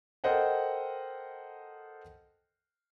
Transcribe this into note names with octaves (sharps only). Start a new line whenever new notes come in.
A4 A#4 C5 D#5 F#5 G5